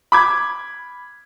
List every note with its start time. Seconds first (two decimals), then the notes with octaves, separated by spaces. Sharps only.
0.12 B5 D6 G#6